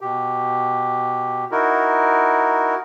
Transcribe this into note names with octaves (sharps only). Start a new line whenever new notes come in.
B2 G4
D#4 E4 F#4 A#4